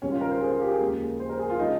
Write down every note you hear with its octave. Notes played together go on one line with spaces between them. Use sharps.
C#2 C3 D#3 G3 C#4
F4
A#4
C5
G#4
F4
G4
G#4
D#2 C#3 F3 G#3
C5
A#4
G#4
F4
C#3 F3 G#3 D#4